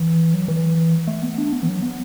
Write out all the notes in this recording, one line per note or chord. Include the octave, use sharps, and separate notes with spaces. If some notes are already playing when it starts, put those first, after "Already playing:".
Already playing: E3
F#3
E3
A3
B3
D4
B3
E3
F#3
B3